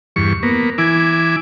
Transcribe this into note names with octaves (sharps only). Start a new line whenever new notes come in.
E2 G2 C#6
A#3 B3
E3 E4 G#5 D6